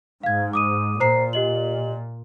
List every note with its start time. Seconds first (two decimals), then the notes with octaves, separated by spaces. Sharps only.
0.23 G#2 F5 G#6
0.53 D6 D#6 D#7
1.00 A#2 C5 A#5 C7
1.33 G4 D#5 F#7